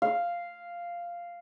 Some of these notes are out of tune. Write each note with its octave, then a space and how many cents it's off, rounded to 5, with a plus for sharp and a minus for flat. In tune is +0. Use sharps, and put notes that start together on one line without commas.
F5 -5